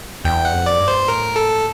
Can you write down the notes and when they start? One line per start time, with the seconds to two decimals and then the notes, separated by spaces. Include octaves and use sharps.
0.24 E2 G5
0.45 F#5
0.52 F2
0.66 D5
0.80 G2
0.88 C5
1.08 A2 A#4
1.36 A4